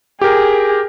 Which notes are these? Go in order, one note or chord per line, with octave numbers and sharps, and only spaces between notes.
G4 G#4 A#4